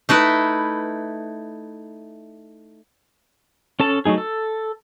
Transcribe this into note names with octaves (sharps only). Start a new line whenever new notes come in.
A3 D#4 E4 B4
C#4 A4 A5
F#3 A3 D#4 G#4
A4